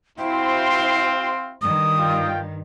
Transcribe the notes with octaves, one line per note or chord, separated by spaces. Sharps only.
C4 E4 F#4 C5 F5 G5 C6
G2 D#3 D#6
F4 G5